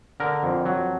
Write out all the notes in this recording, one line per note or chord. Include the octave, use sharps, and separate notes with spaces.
D3 A#4
F2
F#3